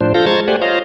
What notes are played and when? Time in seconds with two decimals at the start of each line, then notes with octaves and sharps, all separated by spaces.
0.01 A2 F3 D4 C5
0.14 F3 F4 A4 F5 G6 A#6
0.26 G#3 C5 A#5 C#6 G#6 A6
0.48 A3 G4 C5 D5 F#5 G#5
0.61 F4 C5 C#5 D#5 F5 A#5